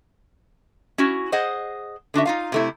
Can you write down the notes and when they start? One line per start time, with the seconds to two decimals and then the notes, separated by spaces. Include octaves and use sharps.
0.98 C#4 E4 F#4
1.32 G#4 C5 D#5 F#5
2.14 D3 D4 F#4 E5
2.25 D#4 F4 F5
2.52 C3 A3 E4